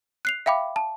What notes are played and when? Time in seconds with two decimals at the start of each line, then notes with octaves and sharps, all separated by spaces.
0.25 F#6 C7 F7
0.46 E5 F5 G5 B5 D6
0.76 A5